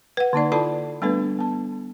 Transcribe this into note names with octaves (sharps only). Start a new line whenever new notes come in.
B4 F#5
D3 A#3 D#4 D5
E4 F4 A4 D5 A5 B5
G3 A3 B3 D4 A4 B4
B3 A5